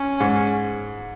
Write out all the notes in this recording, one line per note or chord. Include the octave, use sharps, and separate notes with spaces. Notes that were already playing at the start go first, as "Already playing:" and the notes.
Already playing: C#4
G#2